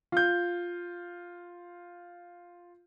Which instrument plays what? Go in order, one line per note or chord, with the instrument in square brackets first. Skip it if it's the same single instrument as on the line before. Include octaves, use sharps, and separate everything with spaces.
[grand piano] F4 G6